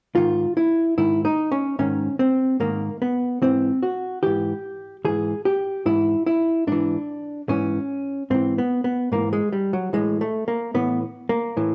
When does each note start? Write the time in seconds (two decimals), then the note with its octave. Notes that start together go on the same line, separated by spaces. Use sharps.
0.15 G#2 D#3 F4
0.57 E4
0.98 G#2 D#3 E4
1.25 D#4
1.52 C#4
1.79 G#2 D#3 C#4
2.19 C4
2.60 G#2 D#3 A#3
3.02 B3
3.42 G#2 E3 C4
3.83 F#4
4.23 G#2 E3 G4
5.05 G#2 E3 G#4
5.45 G4
5.86 G#2 E3 E4
6.26 E4
6.67 G#2 E3 D4
7.49 G#2 E3 C#4
8.30 G#2 E3 C4
8.58 B3
8.84 B3
9.12 G#2 E3 A#3
9.33 G#3
9.53 G3
9.73 F#3
9.93 A2 E3 G#3
10.21 A3
10.48 A#3
10.74 A2 E3 B3
11.29 A#3
11.57 A2 E3